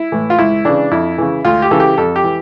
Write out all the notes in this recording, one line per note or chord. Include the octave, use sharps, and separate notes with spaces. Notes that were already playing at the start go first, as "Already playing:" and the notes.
Already playing: E4
A2 E3
F4
C#2 E4
C#3 E3 D4
F2 E4
C#3 E3
D2 F4
G4
C#3 E3 A4
G4
F2 A4
G4
E3